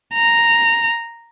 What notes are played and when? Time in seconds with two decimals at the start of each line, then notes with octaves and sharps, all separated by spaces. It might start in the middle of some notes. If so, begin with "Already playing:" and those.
0.14 A#5